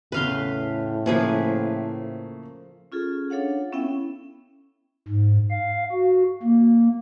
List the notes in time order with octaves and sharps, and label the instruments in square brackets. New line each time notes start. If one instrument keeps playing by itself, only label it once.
[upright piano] E2 C#3 [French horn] A2 [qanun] B4 F5 C6
[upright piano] C#3 A3 A#3 [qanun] F3 G#4 B4
[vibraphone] C#4 F4 G#4 A4
D4 A4 C#5 F5 F#5
B3 C#4 E4 E5 G5
[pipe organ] G#2
F5
F#4
A#3